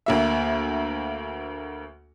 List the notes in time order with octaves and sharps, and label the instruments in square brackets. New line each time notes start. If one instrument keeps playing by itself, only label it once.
[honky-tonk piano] D2 A#3 E5